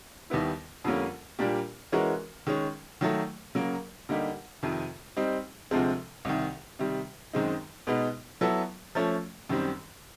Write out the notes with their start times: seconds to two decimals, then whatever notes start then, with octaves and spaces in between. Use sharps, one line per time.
0.30 D#2 D#3 G3 B3 E4
0.84 F2 D3 G3 A#3 C#4
1.39 A#2 G3 A#3 D4 G4
1.92 E3 G#3 C#4 F#4 A#4
2.47 D#3 G#3 C#4
3.01 D#3 F#3 A3
3.55 C#3 F#3 A#3
4.09 D3 G3 A#3 D#4 G4
4.63 F2 C3 D#3
5.17 G3 C4 D#4
5.71 D2 C3 F3 G#3 C4
6.25 C2 C3 D#3
6.79 C3 D#3 G3
7.33 F#2 D#3 G#3 C4 D#4
7.87 B2 G#3 B3 D#4
8.41 F#3 B3 E4 A4
8.95 F3 A3 C#4
9.49 F#2 D#3 G3 C4